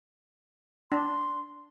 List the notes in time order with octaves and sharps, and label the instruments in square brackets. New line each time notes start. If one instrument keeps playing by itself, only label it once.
[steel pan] D4 [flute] C6